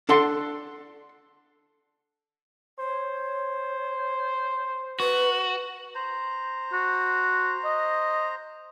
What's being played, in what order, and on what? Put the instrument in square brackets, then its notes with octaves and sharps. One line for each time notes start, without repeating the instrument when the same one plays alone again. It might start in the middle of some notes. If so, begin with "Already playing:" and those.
[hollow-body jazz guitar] D4 A4 F#5 C6
[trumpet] C5 [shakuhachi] C#5
[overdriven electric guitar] F#4 [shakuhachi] B4
[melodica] C5 A#5
[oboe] F#4
D#5